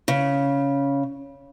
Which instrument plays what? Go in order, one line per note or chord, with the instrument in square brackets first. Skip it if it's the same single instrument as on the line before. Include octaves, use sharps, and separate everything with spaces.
[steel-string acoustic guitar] C#3